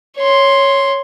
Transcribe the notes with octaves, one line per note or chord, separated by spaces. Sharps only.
C#5 C6